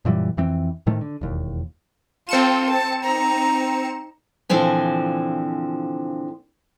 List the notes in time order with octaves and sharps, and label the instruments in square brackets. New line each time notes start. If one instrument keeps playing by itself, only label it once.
[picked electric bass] F#2 A#2 E3 G3
F2 E3 C4
A2 C3 D#3 A3
D3
E1 D#2
[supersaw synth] C4 C#7 E7 [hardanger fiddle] F4 A4
[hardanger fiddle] A5
D#4 A#5
[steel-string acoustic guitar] A#2 D3 E3 F3 C4 G#5